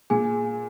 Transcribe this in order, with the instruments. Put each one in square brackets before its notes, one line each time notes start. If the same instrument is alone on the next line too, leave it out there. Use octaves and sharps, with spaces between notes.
[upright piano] A#2 [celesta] G#4 G#5